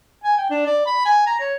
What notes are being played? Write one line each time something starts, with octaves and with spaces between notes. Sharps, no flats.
G#5
G5
D4
D5
B5
G#5
A#5
C#5